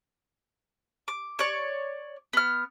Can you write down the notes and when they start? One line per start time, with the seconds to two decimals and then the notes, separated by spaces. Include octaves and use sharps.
1.08 D6
1.39 C#5 D5
2.33 B3 F6